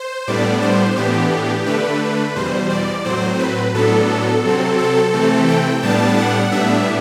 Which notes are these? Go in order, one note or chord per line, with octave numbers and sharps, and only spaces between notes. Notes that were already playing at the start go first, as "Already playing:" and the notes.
Already playing: C5
A2 G3 B3 D4 D5
C5
A2 E3 B3 D4 G4
D3 A3 D4 B4
E2 B2 G3 C5
D5
A2 F#3 C4 C5
B4
A2 F#3 B3 D4 A4
C3 F#3 C4
A4
C3 E3 A3 C4
G5
A2 G3 B3 D4 A5
F#5
A2 G3 B3 D4 E5